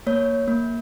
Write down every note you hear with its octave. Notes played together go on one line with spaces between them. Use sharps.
A#3 C#5
A#3